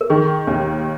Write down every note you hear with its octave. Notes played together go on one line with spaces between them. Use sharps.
A#4
D#3 G#4
D#2